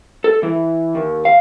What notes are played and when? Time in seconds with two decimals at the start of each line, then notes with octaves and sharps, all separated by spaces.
0.24 A4
0.43 E3
0.95 D#2
1.25 F5